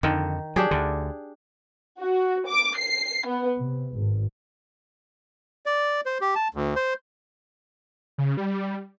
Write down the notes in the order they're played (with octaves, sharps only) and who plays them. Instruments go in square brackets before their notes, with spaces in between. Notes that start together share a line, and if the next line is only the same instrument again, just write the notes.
[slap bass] F2 D3 [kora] D#3
[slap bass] F#3 [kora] D4 G4 G#4
[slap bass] D2 D3
[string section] F#4
D6
C7
B3
C3
G#1
[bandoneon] D5
C5
G4
A5
D2
C5
[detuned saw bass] C#3
G3